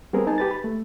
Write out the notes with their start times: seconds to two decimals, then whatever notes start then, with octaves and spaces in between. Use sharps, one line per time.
0.13 G3 B3 C4 G#4 A#4
0.27 D#4 G#5 A5
0.38 G4 B4 A6
0.51 B5
0.64 A3